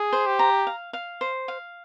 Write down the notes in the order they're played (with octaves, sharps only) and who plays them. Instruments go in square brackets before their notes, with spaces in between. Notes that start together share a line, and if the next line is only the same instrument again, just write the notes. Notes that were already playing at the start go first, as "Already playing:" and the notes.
Already playing: [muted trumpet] G#4
[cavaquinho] C5
[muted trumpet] G4
[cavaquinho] A#5
F5
F5
C5
F5